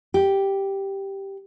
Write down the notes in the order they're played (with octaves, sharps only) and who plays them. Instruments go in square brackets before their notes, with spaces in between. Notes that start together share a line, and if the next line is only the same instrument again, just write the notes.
[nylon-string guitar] G4